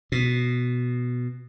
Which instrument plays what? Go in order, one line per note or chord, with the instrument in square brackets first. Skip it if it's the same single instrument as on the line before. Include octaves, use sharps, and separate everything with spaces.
[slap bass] B2